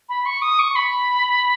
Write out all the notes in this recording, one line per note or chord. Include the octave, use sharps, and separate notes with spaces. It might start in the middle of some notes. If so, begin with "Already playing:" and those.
B5
C#6
D#6
C#6
B5